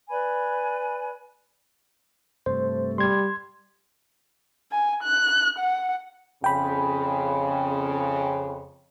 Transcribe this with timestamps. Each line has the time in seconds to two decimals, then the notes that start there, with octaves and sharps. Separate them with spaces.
0.09 B4 D5 G#5 B5
2.46 G2 C3 A3 C5
2.98 G3 C6 G#6
4.72 G#5
5.03 F#6
5.58 F#5
6.44 F2 C#3 G5 B5